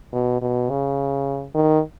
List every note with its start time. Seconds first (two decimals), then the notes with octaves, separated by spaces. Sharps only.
0.13 B2
0.42 B2
0.70 C#3
1.54 D#3